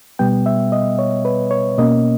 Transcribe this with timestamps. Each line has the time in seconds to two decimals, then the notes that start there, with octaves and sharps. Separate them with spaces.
0.19 B2 G3 B3 G5
0.46 E5
0.72 D#5
0.99 C#5
1.25 B4
1.51 C#5
1.78 B2 A#3 C#4 D#5